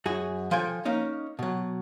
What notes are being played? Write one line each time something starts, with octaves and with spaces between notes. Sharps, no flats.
F#2 F#4 G#4
F3 A4 G5 G#5
A#3 C#4 D#4
B2 F#3